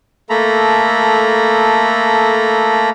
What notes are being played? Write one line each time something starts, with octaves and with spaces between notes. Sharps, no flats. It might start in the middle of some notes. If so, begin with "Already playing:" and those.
A3 A#3 A4 A#5 B5